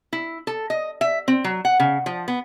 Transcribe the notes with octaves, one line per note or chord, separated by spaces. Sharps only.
E4
A4
D#5
E5
C4
F#3
F#5
C#3
F3
B3